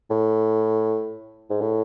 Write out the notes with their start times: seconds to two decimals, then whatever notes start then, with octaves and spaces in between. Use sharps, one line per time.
0.10 A2
1.50 G#2
1.61 A2